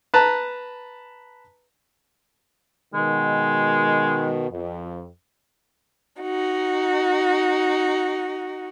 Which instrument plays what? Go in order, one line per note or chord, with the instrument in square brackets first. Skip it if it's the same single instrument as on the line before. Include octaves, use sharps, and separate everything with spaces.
[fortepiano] B4 A5 A#5
[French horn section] B2 D#3 [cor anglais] G#3
[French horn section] F2
[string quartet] D#4 F#4